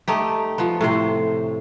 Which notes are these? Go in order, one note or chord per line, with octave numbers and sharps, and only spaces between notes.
A3 D#4 G4
F3 B3
A2 C3 C5